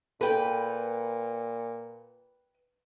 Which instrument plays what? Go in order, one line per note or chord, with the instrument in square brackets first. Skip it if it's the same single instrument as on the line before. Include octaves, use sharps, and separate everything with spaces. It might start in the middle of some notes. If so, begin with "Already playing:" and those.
[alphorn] A#2 [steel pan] A4 [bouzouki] B4 G5